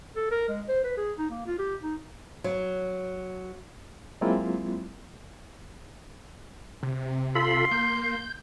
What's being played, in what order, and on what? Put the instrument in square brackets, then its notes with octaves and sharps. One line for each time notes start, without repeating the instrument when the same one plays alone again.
[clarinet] A4
A#4
G#3
C5
B4
G#4
D#4
A#3
F4
G4
D#4
[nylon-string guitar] F#3
[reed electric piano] F#3 G#3 A#3 C4 E4 F4
[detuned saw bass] C3
[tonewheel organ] F4 A4 B5 [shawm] C6
[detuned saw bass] A#3 [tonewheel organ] G6